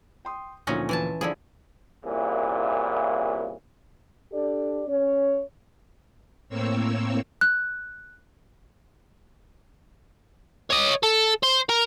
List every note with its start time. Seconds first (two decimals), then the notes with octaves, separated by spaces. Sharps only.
0.25 G5 C6 D#6
0.67 D2 A#2 F3 F#3 C#4 D#4
0.89 E3 G#5 A5
1.21 D3 F3 E4 G#4 B4 D5
2.04 C2 A#2 C#3 E3
4.33 D4 G4 A4 D5
4.88 C#4 C#5
6.49 A2 A#3 C4 C#5 E6
7.41 F#6
10.71 C#5 D#5
11.03 A4
11.43 C5
11.69 A#4